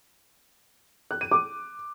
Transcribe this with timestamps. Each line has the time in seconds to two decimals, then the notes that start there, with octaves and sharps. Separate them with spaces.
1.11 F#6
1.21 D#7
1.31 D6